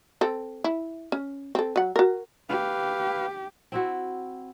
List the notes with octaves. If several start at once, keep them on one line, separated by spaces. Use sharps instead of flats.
C4 A4
E4
C#4
C4 A4
F#3 F#5
F#4 A#4
G4 B4 F5
C4 E4 F#4